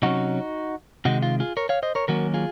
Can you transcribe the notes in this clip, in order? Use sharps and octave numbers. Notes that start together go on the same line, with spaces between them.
C3 F#3 C#4 D#4 F#4
C3 D#3 G#3 D#4 F#4
F4
F4 G#4
A#4 C#5
C#5 F5
C5 D#5
A#4 C#5
D#3 F#3 A#3 C#4 F#4 A#4
F4 G#4